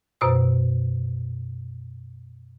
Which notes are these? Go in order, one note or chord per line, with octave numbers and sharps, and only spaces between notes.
F#2 B2 C5 E6